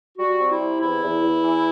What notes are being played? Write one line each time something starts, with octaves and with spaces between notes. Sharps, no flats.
G3 F#4
C4
E4
C3
E2 E4
E2
E2
E3